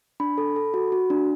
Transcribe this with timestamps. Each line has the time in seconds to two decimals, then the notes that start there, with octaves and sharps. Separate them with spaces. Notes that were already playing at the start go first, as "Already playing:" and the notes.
0.20 D4 B5
0.38 A4
0.56 A4
0.74 F#4
0.92 F#4
1.10 D4